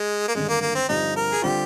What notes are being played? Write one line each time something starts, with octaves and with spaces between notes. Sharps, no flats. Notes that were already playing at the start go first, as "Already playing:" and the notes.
Already playing: G#3
A#3
G#1 G2 D3 G#3
A#3
A#3
C4
G2 D3 F3 C4 D#4 G4
A#4
G#4
D3 G3 C4 F4 G4